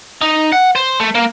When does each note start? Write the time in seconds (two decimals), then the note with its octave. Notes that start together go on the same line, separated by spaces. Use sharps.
0.22 D#4
0.52 F#5
0.75 C5
1.00 A3
1.15 A#3